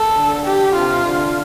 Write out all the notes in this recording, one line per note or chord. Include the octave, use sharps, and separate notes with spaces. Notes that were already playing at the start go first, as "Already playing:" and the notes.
Already playing: A4
D3
G4
C3 F4
D3